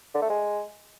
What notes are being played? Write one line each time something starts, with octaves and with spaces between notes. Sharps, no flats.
D3
A3
G#3